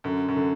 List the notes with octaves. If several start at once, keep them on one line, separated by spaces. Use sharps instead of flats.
F#2 D3
F#2
D3